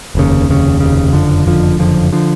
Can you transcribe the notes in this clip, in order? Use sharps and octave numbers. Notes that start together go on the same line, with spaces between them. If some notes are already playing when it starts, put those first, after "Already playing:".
F1 D#2 C#3
F1 D#2 C#3
F1 D#2 C#3
F#1 F2 D3 F3
F#1 F2 D3 F3
F#1 F2 D3 F3
D3 F3